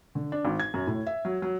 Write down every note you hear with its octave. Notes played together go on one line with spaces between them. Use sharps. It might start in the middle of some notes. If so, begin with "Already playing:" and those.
D3
D4
G#1
G#6
F#2
A2
E5
F#3
F#3